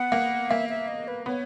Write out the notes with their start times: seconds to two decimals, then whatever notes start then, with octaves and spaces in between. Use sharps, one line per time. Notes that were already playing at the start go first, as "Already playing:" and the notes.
Already playing: B3 F#5
0.12 A#3
0.50 A#3 E5
0.69 E5
0.88 D#5
1.08 B4
1.26 B3 C#5